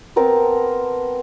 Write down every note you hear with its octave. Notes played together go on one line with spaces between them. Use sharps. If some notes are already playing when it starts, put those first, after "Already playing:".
B3 C4 A#4 A5